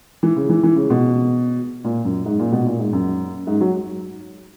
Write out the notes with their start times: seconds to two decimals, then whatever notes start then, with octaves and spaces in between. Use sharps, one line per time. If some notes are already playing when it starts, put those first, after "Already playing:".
0.23 E3
0.36 C#3
0.49 E3
0.63 E3
0.76 C#3
0.90 B2
1.84 A#2
2.05 F#2
2.25 G#2
2.39 A#2
2.52 B2
2.66 A#2
2.79 G#2
2.93 F#2
3.47 G#2
3.61 F#3